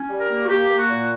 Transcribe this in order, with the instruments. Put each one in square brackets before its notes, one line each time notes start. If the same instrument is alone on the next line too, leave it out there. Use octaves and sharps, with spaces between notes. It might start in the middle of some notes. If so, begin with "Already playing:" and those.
Already playing: [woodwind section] C#4
G3
A#4
A#3
F#4
A#3 G4
A#3
F#4
A#2